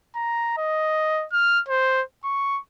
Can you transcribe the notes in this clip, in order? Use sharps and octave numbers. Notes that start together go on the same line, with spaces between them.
A#5
D#5
F6
C5
C#6